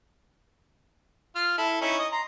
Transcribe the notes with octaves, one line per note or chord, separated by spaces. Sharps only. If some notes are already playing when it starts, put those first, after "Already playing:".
F4 F6
E4 A4
C#4 D#4 E4
D#5
A#5 C6